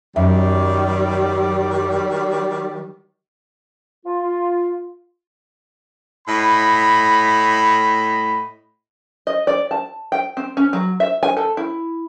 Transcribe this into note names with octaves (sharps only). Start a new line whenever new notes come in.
F#2 D#3 F#3 G3 D#5 E5
F4
A2 D#5 B5
D#5
D5
A5
G5
C4
C#4
F#3
E5
G#5
A4
E4